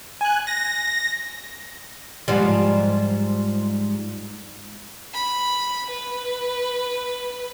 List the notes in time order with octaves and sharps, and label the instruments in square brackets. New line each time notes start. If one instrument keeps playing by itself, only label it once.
[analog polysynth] G#5 F#6
A#6
[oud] G#2 F3 G3
[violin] B5
B4